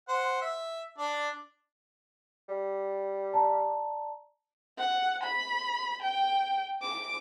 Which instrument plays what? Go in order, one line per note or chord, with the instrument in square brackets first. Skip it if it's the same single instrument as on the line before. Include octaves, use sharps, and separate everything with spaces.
[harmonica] C5 F#5
E5
D4 D5
[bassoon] G3
[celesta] D5 A5 A#5
[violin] F#5
B5
G5
D6